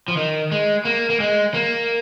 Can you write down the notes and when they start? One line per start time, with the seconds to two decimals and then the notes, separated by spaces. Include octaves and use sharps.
0.08 F3
0.17 D#3
0.52 G#3
0.85 A#3
1.10 A#3
1.20 G#3
1.54 A#3